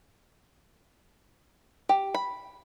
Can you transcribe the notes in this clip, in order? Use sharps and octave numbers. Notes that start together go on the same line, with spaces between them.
G4
B5